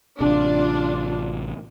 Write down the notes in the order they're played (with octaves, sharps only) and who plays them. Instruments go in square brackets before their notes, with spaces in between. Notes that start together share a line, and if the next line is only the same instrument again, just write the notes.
[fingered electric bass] A1 C3 [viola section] D4 F4